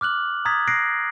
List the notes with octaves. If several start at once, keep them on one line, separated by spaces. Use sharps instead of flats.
D6 F6 F#6 F#7
A#5 D#6 G#6 A6 B6
F#6 A#6 C7 D7